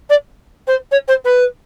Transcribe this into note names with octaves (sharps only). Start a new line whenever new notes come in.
D5
C5
C#5
C5
B4